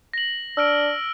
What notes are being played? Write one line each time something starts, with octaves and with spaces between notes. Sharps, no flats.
A#6 F#7
D4 E6 F6 D7